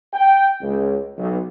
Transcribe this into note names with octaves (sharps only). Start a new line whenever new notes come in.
G5
C#2
B1